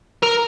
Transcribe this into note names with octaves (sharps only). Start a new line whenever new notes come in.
A#4